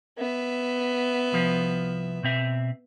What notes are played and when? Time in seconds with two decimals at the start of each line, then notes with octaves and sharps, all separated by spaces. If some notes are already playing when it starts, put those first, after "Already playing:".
0.18 B3 E5
1.32 C2 F3
2.23 B2 C4 E5